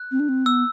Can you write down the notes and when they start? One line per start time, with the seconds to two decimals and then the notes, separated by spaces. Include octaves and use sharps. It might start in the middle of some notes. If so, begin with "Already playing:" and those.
Already playing: F#6
0.11 C4
0.20 D4
0.29 C4
0.45 B3 E6